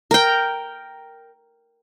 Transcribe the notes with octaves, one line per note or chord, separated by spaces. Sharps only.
A#4 G5